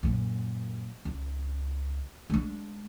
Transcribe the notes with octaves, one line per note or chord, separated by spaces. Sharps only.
F#2 A#2
C#2
G#3 D4